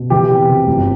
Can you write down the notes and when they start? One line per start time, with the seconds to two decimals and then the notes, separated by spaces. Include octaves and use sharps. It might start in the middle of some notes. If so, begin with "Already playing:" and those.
Already playing: B2
0.10 E3 G4
0.30 C3
0.49 C3
0.67 G1